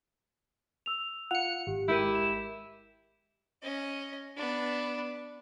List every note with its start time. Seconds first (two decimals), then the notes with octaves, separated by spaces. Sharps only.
0.86 E6 F7
1.31 F4 F5 F#5 C#7 F7
1.67 G#1 G4
1.88 G#3 E4 G4 A#4 G6 D#7
2.15 E7
3.63 C#4 D#5
4.36 B3 D4